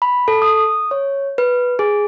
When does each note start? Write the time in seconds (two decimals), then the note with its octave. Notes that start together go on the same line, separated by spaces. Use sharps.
0.02 B5
0.28 A4
0.42 D#6
0.91 C#5
1.38 B4
1.79 G#4